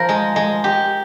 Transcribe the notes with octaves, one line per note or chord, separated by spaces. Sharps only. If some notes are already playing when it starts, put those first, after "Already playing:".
Already playing: F3 A#4
G#3
G#3
G4